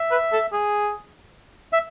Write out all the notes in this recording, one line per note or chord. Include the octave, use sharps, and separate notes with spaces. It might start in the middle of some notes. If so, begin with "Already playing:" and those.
Already playing: E5
B4
A4
G#4
E5